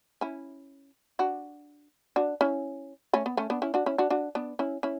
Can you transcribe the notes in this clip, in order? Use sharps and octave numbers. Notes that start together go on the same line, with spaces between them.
C#4 E4
D4 F#4
D4 F#4
C#4 E4
A3 C#4
B3
A3 C#4
B3 D4
C#4 E4
D4 F#4
C#4 E4
D4 F#4
D4 F#4
B3 D4
C#4 E4
C#4 E4